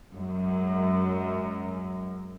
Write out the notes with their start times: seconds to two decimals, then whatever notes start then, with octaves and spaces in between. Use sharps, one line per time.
0.14 F#2 G#3